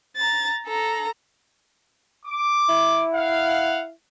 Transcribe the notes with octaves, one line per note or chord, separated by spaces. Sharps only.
A#5 A6
A4 A#5
D6
E4
F5 F#5